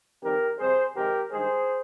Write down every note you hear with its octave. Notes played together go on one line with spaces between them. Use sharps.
F2 D#3 G3 G4 A#4
F2 C3 G3 G#4 C5
F2 C3 D#3 G#3 G4 A#4
G2 D#3 G#3 G#4 C5